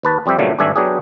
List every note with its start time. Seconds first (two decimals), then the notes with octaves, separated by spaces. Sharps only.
0.03 D#2 B4 A5
0.26 F2 G3 C4 G4 E5
0.38 G2 A#2 C#3 F#3 G3 A3
0.59 G#1 G2 A3 D4 E5 G#5
0.76 F#3 B3 D4 G4 G#4